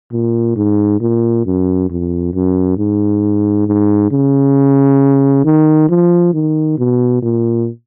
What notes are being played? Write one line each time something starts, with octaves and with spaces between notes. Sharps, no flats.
A#2
G#2
A#2
F#2
F2
F#2
G#2
G#2
C#3
D#3
F3
D#3
B2
A#2